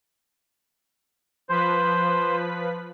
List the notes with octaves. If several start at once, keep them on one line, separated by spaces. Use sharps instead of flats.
F3 B4 C5 B6